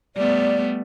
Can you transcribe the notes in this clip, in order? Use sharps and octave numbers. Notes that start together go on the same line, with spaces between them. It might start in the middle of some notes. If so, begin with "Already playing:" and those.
G3 A3 B3 D5